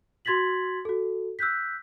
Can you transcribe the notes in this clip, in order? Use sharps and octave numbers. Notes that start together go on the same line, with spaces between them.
F#4 C6 G#6 A6 B6 F#7
F#4 A4
E6 F#6 G6 B6